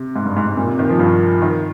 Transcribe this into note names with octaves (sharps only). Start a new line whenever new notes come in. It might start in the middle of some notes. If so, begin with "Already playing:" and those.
Already playing: C3
G#2
G2
G#2
G#2
A#2
C3
D#3
F3
G2
D#3